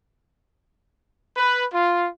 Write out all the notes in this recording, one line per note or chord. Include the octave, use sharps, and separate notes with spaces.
B4
F4